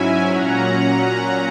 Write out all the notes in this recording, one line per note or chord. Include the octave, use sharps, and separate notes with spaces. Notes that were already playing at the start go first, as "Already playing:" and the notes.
Already playing: G#2 F#3 C#4 E4 E5 G#5
A#2 F#3 C#4 F#5 A#5